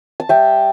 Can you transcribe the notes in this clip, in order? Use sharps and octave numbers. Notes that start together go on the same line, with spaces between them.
A5
G3 E5 G5